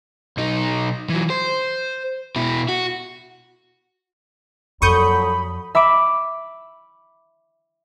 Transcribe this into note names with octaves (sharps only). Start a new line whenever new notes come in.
B1 D#4
E3 F#3
C5
B2 E4
F#4
F2 A#2 F#3 A4 B5 C#6 D#6 G6
E5 B5 D6 D7